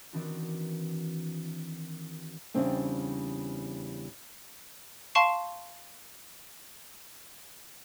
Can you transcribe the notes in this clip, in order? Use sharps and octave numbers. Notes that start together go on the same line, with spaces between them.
D#3 E3 C4 D4 F#4
E2 C#3 G3 C4 D4
F5 A5 C6 C#6 C7 E7